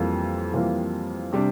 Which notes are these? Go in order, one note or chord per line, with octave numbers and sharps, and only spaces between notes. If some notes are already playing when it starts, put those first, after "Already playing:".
Already playing: F2 E3 G3 A#3 F4
F2 E3 G3 A#3 F4
C3 G3 D4